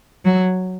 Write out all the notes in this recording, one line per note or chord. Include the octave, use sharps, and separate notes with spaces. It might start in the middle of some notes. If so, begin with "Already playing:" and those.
F#3